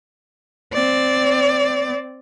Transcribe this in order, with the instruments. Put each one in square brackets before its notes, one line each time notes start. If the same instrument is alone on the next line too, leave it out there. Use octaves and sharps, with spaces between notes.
[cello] C4 D5